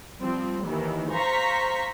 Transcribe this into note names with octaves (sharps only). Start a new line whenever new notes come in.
F3 G3 C4
D#2 D#3 E3
C5 F5 A#5 C#6 B6